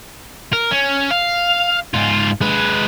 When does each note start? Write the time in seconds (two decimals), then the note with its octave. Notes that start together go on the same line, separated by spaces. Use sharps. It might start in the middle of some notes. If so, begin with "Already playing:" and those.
0.53 A#4
0.71 C#4
1.11 F5
1.94 G#2 F4
2.41 G#3 B4